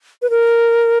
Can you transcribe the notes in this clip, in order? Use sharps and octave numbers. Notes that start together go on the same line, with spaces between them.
B4
A#4